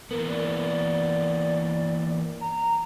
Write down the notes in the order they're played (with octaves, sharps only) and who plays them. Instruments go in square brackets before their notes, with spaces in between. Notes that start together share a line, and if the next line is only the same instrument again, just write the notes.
[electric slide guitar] E3 A#3 B3 [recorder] A#4
[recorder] D5
A#5